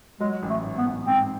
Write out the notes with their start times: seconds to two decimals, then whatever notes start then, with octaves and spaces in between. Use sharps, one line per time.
0.20 F#3 G#3
0.43 A1
0.49 A3
0.64 G#2
0.78 B3
0.85 A1
1.07 G#2 C4